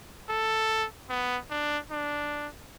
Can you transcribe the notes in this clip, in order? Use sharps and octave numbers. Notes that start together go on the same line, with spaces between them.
A4
B3
D4
D4